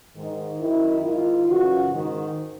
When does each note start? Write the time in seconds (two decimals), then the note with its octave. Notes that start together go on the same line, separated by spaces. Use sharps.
0.15 G#2 D#3
0.59 F#2 D#3 E4
1.03 G#2 D#3 F4
1.48 F#2 C#3 E3 F#4
1.91 G#2 D#3